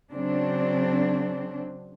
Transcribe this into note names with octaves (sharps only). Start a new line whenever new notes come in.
C#3 F#3 C4 D4